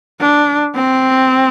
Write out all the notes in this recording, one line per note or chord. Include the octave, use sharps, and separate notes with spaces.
D4
C4